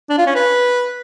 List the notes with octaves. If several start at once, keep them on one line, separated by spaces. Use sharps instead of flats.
D4
F4
C#4
B4